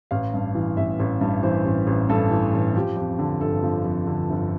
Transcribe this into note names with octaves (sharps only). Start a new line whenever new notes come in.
A1 F5
G2
E3
A1 E5
A1
G2
E3 C5
A1
A1
G2 A4
E3
A1
F3 G4
F2
D3
G1 A4
F3
F2
D3
G1